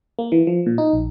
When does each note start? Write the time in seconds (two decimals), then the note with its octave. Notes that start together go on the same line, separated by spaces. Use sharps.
0.19 A#3
0.32 E3
0.47 F3
0.67 A#2
0.78 D#4
0.93 A#1